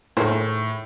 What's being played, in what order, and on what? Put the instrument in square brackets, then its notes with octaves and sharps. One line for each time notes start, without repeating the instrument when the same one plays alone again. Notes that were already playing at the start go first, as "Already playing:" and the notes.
[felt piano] A2 [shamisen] D#3 G#4 C5